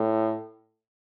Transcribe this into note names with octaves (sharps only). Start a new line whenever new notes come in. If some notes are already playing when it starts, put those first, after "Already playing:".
Already playing: A2